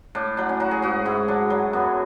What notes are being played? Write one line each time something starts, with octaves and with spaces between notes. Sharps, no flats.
A2 D4
F#3 D4
C#4
F#3 F#4
G#4
G#2 F#4
G#2 E4
F#3 D4
F#3
F#2 B3